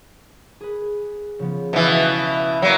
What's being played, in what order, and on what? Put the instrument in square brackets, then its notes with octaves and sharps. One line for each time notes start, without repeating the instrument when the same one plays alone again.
[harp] G#4 B4
C#3 F3 B3
[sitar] B2 E3 [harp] E5 F5 E6
[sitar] F#3 A#3 [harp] F#4